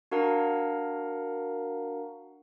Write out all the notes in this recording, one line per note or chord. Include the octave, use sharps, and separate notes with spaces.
D4 F#4 A#4 F5 F#5 A#5